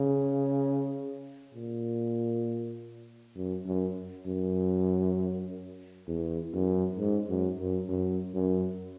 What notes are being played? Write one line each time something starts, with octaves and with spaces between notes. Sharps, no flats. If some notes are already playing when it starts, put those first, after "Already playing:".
Already playing: C#3
A#2
F#2
F#2
F#2
E2
F#2
G#2
F#2
F#2
F#2
F#2